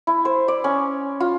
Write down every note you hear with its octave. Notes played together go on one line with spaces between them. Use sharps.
E4
C5
D5
C#4
F4